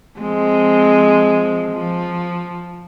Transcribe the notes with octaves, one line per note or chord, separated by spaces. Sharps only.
F3 G#3 C4
F3